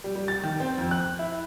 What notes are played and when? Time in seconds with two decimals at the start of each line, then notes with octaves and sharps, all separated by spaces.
0.04 G3
0.16 G3
0.28 A6
0.43 D#3
0.60 C4
0.78 F2
0.91 F#6
1.19 E4